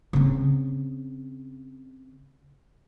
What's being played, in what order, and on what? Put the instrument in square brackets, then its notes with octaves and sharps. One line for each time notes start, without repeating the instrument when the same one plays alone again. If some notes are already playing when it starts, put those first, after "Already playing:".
[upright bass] C#3 C4